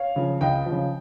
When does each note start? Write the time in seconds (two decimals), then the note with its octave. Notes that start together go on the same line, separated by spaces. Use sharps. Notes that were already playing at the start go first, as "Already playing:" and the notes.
Already playing: C#5 F5
0.16 C#3 F3
0.41 C#2 D#5 G5
0.66 C#3 F3